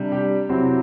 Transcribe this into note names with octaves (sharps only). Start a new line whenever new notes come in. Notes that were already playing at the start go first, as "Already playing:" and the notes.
Already playing: C3 G3 D4
G4
C3 F#3 C4 E4